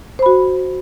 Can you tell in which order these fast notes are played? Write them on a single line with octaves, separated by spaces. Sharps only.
C5 B5 F#4